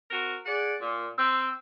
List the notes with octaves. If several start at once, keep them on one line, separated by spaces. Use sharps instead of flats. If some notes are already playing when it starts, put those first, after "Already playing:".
C4 F#4 A#4
G#4 D5 F#5
A#2
C4 E6